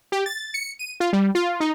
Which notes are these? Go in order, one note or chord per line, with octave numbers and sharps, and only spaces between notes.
G4
A6
C#7
D#7
F4
G3
F4
D#4